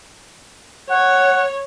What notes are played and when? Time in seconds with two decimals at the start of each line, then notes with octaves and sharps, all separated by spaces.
0.91 C#5 F#5